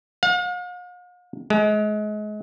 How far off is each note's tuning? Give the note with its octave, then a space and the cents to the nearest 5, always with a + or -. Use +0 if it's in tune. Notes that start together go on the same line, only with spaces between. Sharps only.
F5 +45
G#3 +30